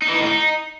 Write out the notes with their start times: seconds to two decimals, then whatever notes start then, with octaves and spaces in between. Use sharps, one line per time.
0.02 D#4
0.08 E3
0.14 D#4
0.20 A2
0.26 D#4